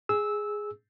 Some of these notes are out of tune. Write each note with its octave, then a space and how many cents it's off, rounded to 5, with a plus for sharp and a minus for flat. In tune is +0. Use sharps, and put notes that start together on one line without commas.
G#4 +0 E6 -15